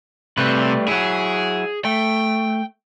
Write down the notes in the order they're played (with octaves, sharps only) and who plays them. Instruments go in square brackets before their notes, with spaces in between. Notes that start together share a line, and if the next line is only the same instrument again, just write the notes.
[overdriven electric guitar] C3 [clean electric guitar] G3 A3 B4
[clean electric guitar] F#3 E4 [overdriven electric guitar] G#4
[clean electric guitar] A3 [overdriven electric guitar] G5